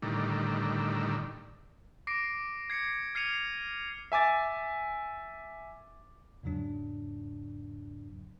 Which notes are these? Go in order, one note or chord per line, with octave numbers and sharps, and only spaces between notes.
A2 D3 D#3 G3
D6 A#6 C7 D7
G#6 C7 C#7
F6 G#6 C7 C#7 D#7 F7
E5 G#5 D6 A6
E2 G#2 C#3 F#3 D4